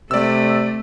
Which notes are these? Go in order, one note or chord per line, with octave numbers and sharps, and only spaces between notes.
C3 A3 D5 E6